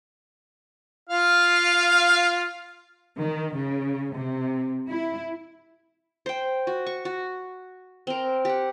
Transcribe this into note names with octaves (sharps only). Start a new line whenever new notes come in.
F4 F5
D#3
C#3
C3
E4
C5 G5
F#4
C#6
F#4
C4 A#4
G4 F#5